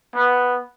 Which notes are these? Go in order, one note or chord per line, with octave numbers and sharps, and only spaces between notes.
B3